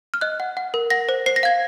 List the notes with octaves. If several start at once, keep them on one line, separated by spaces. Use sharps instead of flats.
F6
D#5 F#6
F#5
F#5
A#4
F#5 A#6
C5
C5 C7
A#6
F5 G#6